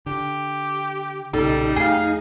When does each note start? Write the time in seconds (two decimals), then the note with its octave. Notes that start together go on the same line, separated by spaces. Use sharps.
0.06 D3 G4
1.33 B1 A#2 C#3 G3 D#4 A4
1.76 F2 A3 G#4 F5